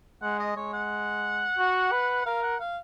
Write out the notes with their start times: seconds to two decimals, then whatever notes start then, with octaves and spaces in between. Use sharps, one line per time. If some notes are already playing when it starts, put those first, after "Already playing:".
0.22 G#3 F#5
0.39 D#5
0.56 G#3 C#5
0.73 F#5
1.58 F#4
1.92 B4
2.26 A#4 F5
2.43 F#5
2.60 F5